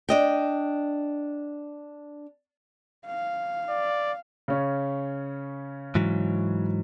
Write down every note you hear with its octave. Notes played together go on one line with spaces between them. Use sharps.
D4 D#5 G5
F5
D5
C#3 C#4
G#2 E3 F#3